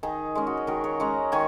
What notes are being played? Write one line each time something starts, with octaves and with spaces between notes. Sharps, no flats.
D#3 D#4 G#4
G#3 C#4
F#4
G#4
D#3 F#4 A#4
G#4 C#5
G#3 C#4 F#5 A#5
D#3 G#5 C#6